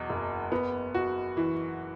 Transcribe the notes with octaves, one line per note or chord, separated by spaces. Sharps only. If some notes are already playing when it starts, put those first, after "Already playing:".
Already playing: E2 B2 F#3
F#1
B3
F#4
E3